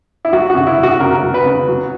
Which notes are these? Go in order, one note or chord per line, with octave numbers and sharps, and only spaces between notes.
E4
F#3 F#4
F#4
C#3
E4
F#3
F#4
C#3 A#4
F#3
B4
C#3
F#3